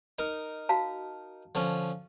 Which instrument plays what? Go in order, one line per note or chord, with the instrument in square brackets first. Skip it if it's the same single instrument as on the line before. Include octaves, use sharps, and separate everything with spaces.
[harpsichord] D#4 A#4
[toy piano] F#4 F5 A5
[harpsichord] D3 F3 C#4